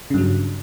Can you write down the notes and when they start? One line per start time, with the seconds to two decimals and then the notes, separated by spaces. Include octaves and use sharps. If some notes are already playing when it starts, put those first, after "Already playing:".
0.10 C#3
0.14 G2
0.18 F#3